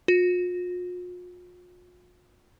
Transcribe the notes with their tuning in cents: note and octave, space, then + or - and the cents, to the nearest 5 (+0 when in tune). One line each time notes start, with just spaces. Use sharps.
F4 +45